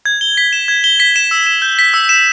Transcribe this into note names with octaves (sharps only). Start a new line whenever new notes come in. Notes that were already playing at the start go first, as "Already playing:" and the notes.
G#6
G7
B6
E7
G#6
G7
B6
E7
E6
E7
G6
B6
E6
E7